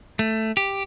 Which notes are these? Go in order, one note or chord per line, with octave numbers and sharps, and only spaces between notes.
A3
G4